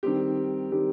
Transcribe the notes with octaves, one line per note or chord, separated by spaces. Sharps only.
D#3 G3 C4 G4
D#3 G3 C4 G4